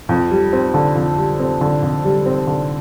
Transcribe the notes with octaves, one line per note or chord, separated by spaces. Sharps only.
F2
G3
C4
D3
F2
G3
C4
D3
F2
G3
C4
D3